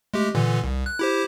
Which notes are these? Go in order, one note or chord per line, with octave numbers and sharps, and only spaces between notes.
G#3 A3 G4
A#2 D3 E3
C2
F#6
E4 G4 C5